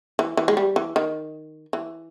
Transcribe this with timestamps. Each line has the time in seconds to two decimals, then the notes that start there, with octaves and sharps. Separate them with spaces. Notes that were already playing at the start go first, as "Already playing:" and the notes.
0.19 E3
0.37 E3
0.48 G#3
0.57 G3
0.76 E3
0.96 D#3
1.73 E3